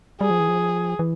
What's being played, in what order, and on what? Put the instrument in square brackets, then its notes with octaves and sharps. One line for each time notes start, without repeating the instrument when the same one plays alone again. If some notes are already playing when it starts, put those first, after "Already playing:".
[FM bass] G3 [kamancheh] G#4
[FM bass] F3
E3
F3
E3